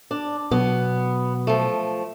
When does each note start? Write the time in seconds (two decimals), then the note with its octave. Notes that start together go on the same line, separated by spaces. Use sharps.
0.11 D4
0.51 B2 F#3 B3
1.47 F3 A3